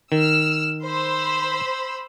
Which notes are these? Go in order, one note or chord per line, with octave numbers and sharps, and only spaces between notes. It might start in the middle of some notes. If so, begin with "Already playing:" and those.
D#3 E6 F6
C5 B5 E6